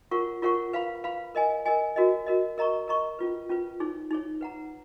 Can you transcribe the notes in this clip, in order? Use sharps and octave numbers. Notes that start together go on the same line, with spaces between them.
F4 A#4 C#5 F#5 C#6
F4 A#4 C#5 F#5 C#6
B4 F5 B5
B4 F5 B5
A#4 D#5 G#5
A#4 D#5 G#5
F#4 A#4 D#5
F#4 A#4 D#5
A#4 D#5 A#5 C#6
A#4 D#5 A#5 C#6
C#4 F4 B4
C#4 F4 B4
D#4 G#4 C#5
D#4 G#4 C#5
B4 F#5 A#5